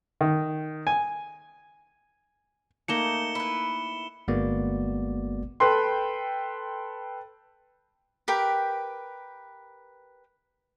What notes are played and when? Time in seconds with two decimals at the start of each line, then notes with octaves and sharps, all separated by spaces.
0.21 D#3
0.87 G#5
2.88 A3 A#3 D#4 C#7 E7 G7
3.35 E4 B4
4.28 G1 G#3 A#3 B3 F#4 D5
5.60 A4 B4 G5 C6
8.28 G4 A#4 B4 G5